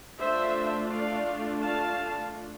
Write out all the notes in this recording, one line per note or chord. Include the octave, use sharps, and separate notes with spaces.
A3 D4 F4 C5 E5
D5 F5
F5 A5